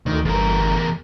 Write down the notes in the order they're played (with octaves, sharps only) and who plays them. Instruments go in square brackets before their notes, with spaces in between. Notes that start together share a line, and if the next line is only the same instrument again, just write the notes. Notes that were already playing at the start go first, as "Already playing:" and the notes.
[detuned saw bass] D2 [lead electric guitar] D#3
[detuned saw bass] G1 [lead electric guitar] E2 A#4